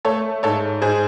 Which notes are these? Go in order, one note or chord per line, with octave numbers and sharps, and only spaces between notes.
A3 A4 C#5
G#2 A4 C#5
G#2 G#4 C5